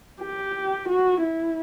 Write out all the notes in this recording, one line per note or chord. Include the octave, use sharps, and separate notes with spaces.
G4
F#4
E4